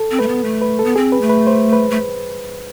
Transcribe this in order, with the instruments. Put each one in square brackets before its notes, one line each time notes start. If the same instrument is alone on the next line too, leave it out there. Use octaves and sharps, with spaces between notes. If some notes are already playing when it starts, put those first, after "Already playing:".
Already playing: [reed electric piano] A4
[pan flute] C4
[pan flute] A3 [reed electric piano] B4
[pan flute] B3
A3
[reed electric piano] B4
A4
[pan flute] B3
[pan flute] C4 [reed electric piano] G#4
[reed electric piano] B4
[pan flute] A3
[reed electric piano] B4
C5
B4
[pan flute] A3